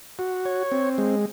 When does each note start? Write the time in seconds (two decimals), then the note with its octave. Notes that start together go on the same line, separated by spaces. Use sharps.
0.19 F#4
0.45 C#5
0.72 C4
0.98 G#3